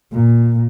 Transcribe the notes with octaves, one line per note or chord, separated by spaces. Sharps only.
A#2